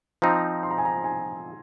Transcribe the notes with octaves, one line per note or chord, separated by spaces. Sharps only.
F3 C4 D#4 A#5
C6
A#5
G#5
A#5
G#5